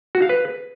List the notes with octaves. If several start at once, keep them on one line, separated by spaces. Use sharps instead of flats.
F#4
F5
B4